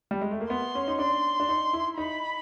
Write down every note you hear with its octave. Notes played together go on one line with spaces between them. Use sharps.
G3
G#3
A3
A#3
B3 C6
C#4
D#4
D4 C6
D4
D#4
E4
D#4 B5